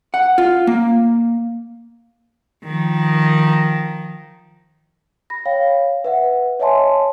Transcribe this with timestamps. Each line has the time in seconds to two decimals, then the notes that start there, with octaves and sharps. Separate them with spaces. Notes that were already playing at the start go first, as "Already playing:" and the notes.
0.14 F#5
0.38 F4
0.67 A#3
2.64 D#3 F3
5.30 B5 A#6
5.45 C#5 F5 G5
6.04 B4 E5 F#5
6.59 C#5 D#5 E5 G#5 A5 C6